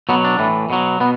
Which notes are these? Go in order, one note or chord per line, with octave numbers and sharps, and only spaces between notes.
B2 F#3 B3
D4
A2 E3
B2 F#3
B2 B3